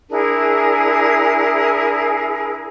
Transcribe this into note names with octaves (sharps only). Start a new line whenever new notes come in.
D4 E4 G#4 A#4